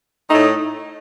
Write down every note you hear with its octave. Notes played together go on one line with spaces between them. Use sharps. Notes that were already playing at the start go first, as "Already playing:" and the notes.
A2 A3 D#4